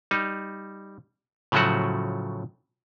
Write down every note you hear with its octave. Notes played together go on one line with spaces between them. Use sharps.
G3 D#4
A2 C#3 F3 F#3 A3 F#4